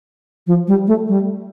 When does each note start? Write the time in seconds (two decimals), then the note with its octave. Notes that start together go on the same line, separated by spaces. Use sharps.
0.47 F3
0.68 G3
0.87 A3
1.08 G3